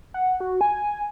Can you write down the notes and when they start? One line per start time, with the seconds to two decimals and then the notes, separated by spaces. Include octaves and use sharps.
0.14 F#5
0.40 F#4
0.61 G#5